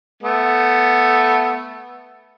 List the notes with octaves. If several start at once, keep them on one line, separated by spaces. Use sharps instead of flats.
A3 B3